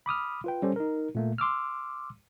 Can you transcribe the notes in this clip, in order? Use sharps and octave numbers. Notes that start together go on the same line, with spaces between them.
B5 D6 D#6 F6
F4 B4 G5
G3 C#4 G4 A4 C5
D#4 A#4
A#2 A3 A#3
C6 D6 E6 F6